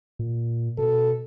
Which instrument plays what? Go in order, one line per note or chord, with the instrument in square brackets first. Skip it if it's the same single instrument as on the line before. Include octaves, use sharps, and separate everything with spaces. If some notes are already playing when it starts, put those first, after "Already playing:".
[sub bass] A#2
[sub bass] B2 [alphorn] A4